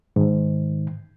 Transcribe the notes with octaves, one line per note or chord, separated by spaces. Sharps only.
G#2 D#3